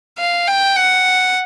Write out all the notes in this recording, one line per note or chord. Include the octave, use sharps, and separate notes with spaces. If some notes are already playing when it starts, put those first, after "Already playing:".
F5
G5
F#5